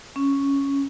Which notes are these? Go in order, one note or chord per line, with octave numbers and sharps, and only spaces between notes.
C#4